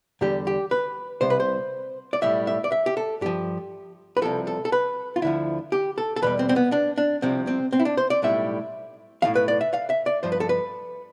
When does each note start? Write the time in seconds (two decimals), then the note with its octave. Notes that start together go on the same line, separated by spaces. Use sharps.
0.21 E2 D3 G3 G4
0.47 G4
0.71 B4
1.21 C2 C3 C5
1.30 B4
1.40 C5
2.13 D5
2.22 B1 A2 G3 E5
2.47 E5
2.64 D5
2.72 E5
2.86 G4
2.97 A4
3.21 G2 F3 G4
4.17 B4
4.22 C2 C3 F3 A4
4.47 A4
4.65 A4
4.72 B4
5.16 F4
5.22 D2 D3 F3 E4
5.72 G4
5.98 A4
6.16 A4
6.22 E2 B2 G3 B4
6.39 C4
6.49 C4
6.56 B3
6.72 D4
6.98 D4
7.22 C2 C3 F3 C4
7.47 C4
7.73 C4
7.80 E4
7.85 D4
7.97 C5
8.10 D5
8.22 B1 A2 G3 E5
9.22 B1 A2 E3 F5
9.35 B4
9.48 D5
9.61 E5
9.73 F5
9.90 E5
10.06 D5
10.23 G2 F3 C5
10.32 B4
10.40 A4
10.49 B4